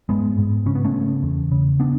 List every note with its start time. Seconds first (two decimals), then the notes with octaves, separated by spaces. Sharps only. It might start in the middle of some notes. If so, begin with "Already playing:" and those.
0.09 G#2 G#3 B3
0.38 G#2
0.66 C#3 C#4
0.75 B3
0.85 A3 C#4
0.94 C#3
1.23 E2
1.52 C#3
1.80 B3 D4